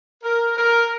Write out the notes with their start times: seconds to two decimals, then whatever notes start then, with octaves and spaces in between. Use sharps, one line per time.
0.24 A#4
0.57 A#4